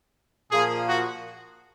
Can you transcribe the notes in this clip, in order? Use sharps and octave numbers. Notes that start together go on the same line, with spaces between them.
A#2 F3 A#3 G#4
F#4